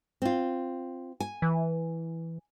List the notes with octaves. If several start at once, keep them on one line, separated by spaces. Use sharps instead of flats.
C4 F4
G#5
E3